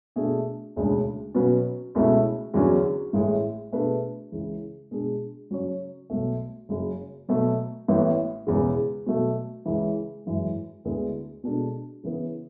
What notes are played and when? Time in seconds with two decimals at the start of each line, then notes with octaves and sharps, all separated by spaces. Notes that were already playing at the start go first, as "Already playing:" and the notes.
0.16 B2 A3 D4 G#4
0.76 E1 D2 C#3 G#3 D4
1.35 B2 F#3 C#4 F#4 B4
1.95 C#2 B2 A3 C#4 E4
2.54 E2 D3 F#3 C#4 F#4
3.13 A1 A2 G#3
3.72 B2 A3 D4 G#4 B4
4.32 C#2 C#3 E3
4.91 B2 G#3 D4 G#4
5.51 C#3 F#3 C#4 F#4 C#5
6.10 B1 B2 A3
6.69 F#1 F#2 C#3
7.29 B2 F#3 A3
7.88 A1 A2 E3 B3
8.47 E1 E2 C#3
9.06 B2 F#3 A3
9.66 C#2 C#3 E3
10.25 G#1 F#2 E3 G#3
10.85 D2 D3 G#3 B3 E4
11.44 B2 G#3 D4 A4
12.03 C#3 E3 B3